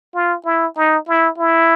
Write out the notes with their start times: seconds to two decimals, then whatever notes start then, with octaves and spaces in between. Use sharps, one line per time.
0.15 F4
0.45 E4
0.77 D#4
1.08 E4
1.38 E4